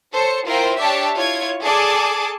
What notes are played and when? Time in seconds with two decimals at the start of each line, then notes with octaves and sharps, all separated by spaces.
0.14 A4 C5 C#5 C#7
0.46 E4 F4 A#4 C5 G5
0.80 D4 G4 C#5 E5 G5 A5
1.17 E4 F4 C#5 G#6
1.62 G#4 A4 D5 G#5 A5 D6